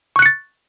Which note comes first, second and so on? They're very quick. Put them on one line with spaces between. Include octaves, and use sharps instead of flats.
C#6 F#6 C#7 A6